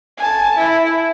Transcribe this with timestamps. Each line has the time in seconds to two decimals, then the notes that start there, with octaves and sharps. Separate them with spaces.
0.18 G#5 A5
0.57 E4